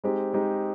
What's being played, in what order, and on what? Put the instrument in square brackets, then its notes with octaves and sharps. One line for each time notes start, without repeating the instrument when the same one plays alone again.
[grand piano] G#3 C4 D#4 G4
G#3 C4 D#4 G4